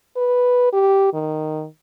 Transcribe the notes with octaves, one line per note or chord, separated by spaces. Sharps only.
B4
G4
D#3